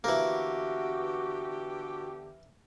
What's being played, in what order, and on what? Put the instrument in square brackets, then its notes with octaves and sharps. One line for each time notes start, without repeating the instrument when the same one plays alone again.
[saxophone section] D3 B3 G4 [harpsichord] E3 A#3 [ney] F#4